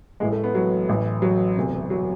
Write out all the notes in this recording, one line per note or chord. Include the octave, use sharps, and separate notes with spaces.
A1 A2 E3 G#3
A3
B3
F#3
A1 A2 E3
F#3
E1 D2 C3
F#3